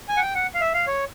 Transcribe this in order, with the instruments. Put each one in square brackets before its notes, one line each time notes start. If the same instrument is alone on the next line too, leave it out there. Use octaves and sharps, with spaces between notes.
[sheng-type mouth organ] G#5
F#5
G5
F#5
F5
E5
F5
C#5